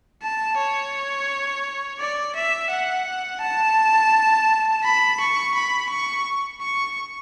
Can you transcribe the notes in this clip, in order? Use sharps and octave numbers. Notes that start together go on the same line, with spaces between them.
A5
C#5
D5
E5
F#5
A5
B5
C#6
B5
C#6
C#6